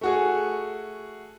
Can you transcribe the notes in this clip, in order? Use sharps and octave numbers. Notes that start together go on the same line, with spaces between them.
A3 F#4 G#4